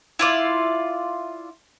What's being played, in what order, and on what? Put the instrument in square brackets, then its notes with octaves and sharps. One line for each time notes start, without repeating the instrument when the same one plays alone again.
[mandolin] E4 F4 D5